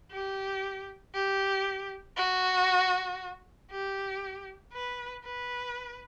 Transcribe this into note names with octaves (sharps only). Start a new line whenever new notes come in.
G4
G4
F#4
G4
B4
B4